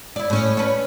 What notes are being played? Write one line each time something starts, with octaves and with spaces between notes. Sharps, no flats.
E4 D5
A2 C#4
C#4 B4